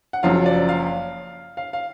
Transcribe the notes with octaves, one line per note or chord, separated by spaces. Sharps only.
F#5
F#1 F#2 F3 F5
D5
F5
F5
F5